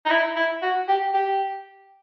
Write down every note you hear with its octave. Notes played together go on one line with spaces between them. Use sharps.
D#4
E4
E4
F#4
G4
G4